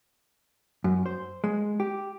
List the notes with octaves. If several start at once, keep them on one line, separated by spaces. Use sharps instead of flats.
F#2
C5
G#3
G4